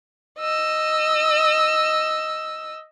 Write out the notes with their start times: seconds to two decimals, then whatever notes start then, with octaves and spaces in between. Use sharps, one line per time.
0.39 D#5 E6